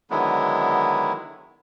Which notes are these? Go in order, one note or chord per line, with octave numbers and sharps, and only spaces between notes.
D3 D#3 F#3 G#3 B3 E4